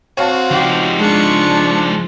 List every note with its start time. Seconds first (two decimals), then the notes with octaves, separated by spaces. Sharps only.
0.17 C4 F#4 C#5 F5 A5
0.51 F3 D#4 G4
0.99 G#3 D4 F4 C#6